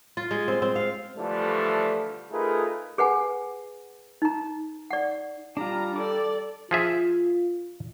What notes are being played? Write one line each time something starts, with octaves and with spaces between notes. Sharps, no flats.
F4
G#3
C4
C4
F5
D3 E3 F3 G3 A3
A3 D#4 F4 G#4 A#4 B4
G#4 B4 F#5 G#5
D#4 A#5
D5 F#5
G3 D4 F4 A#5
A4 D5 D6
F3 F4 G#4 E5